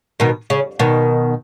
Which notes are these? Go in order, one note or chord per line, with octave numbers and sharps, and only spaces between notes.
B2 D#3
C#3
B2 D#3